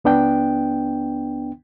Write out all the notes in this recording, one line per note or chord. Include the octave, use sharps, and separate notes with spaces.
C#2 B3 D4 G5